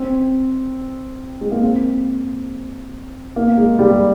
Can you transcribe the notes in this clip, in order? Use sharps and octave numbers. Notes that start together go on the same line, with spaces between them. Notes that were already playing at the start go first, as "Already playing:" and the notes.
Already playing: C4
G#3
A#3
C4
A#3
G#3
G3